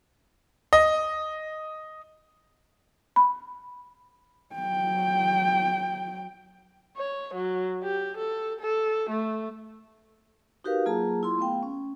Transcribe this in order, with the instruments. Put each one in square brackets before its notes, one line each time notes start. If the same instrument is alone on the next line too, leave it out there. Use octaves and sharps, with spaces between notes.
[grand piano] D#5
[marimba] B5
[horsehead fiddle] F#3 G5
[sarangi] C#5
F#3
G4
A4
A4
A3
[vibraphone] D#4 F#4 G4 A#4 B4 F5
F#3 A#3 F4 G#4 A5 A#5
E4 F4 C6
A3 B3 F5 G5
C#4